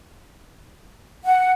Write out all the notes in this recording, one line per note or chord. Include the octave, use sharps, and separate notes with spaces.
F#5